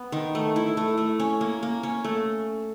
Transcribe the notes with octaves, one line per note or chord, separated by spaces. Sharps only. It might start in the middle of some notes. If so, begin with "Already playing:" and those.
Already playing: B3
D#3
A3
E4
A3
A3
C#4
A#3
A#3
C#4
A3